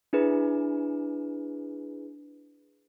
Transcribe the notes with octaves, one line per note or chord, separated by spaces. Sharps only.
D4 E4 G#4 B4